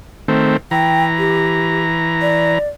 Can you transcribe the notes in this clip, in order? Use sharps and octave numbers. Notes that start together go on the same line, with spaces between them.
D#3 A3 C4
E3 G5 A#5
G4
D5